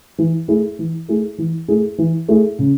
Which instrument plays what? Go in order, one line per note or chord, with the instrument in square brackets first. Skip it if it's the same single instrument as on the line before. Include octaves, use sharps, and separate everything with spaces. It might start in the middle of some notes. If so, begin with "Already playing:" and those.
[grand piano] E3
A3 E4 G#4
E3
A3 E4 G#4
E3
A3 E4 G#4
E3
A3 E4 G#4
C#3